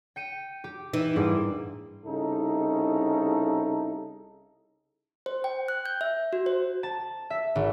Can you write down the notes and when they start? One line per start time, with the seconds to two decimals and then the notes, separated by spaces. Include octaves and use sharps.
0.16 G5 C#7 D#7
0.64 G4
0.93 E3 D#4
1.16 G#2 G3 A#3 D4 G#4 D6
2.05 C2 C#3 D#4 E4 A4
5.26 C5
5.44 G5
5.68 F#6
5.86 G6
6.01 E5
6.33 F#4
6.46 C5
6.83 A5
7.30 E5
7.55 G#1